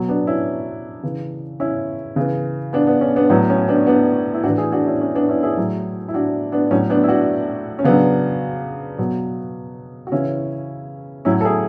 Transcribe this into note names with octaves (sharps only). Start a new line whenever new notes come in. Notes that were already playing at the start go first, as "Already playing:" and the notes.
Already playing: B2 F#3
B3 D4
C#4 E4
C#3 E3
C#4 E4
C#3 E3
B3 D4
B3
C#4
B3 D4
A2 F#3 B3
C#4
B3 D4
B3 D4
E4
A2 E3 D4 F#4
E4 G#4
D4 F#4
C#4 E4
C#4
B3 D4
C#4 E4
E4 G#4
A2 F#3
E4
D4 F#4
B3 D4
A2 F#3 C#4
B3 D4
E4
D4 F#4
C#4
C#3 F#3 B3 D4
B2 F#3
F#4
C#3 E3 C#4 E4
A2 F#3 C#4 E4
A4
E4 G#4